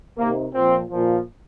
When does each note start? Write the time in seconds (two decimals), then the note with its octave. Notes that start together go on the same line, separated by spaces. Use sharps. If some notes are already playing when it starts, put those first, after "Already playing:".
0.17 C3 D#3 A#3
0.53 A#2 F3 C4
0.89 A#2 F3